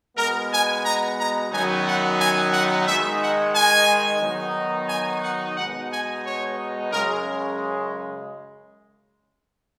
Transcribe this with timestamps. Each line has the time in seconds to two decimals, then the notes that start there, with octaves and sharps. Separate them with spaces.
0.17 B2 G#3 B3 A#4
0.51 G#5
0.84 A#5
1.18 A#5
1.52 F#2 D#3 F#3 B3 D#4 G#5
1.86 F#5
2.19 G#5
2.53 F#5
2.86 D#3 G#3 D#4 E5
3.21 F#5
3.54 G#5
4.21 D#3 F#3 B3 D#4
4.89 G#5
5.22 F#5
5.56 B2 G#3 B3 D#4 F#5
5.90 G#5
6.24 C#5
6.91 F#2 C#3 G#3 A#4